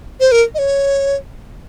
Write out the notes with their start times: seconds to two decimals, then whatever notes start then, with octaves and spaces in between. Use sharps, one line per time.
0.20 C5
0.32 A#4
0.55 D#5
0.59 C#5